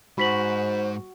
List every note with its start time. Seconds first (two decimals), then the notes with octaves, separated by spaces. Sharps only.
0.18 G#2 F#4 C5 B5 B6 F#7